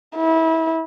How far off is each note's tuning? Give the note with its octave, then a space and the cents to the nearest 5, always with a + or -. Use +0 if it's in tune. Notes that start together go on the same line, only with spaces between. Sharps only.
E4 -25